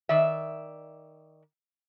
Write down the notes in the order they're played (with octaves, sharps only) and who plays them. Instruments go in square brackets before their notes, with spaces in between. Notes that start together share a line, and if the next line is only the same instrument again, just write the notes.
[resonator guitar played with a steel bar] D#3 D5 E5